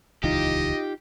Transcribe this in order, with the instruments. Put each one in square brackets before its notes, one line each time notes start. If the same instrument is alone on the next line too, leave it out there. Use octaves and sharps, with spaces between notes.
[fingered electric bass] D#1 C#2 E3 [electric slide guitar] D#4 F4 [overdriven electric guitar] G4 [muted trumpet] D#5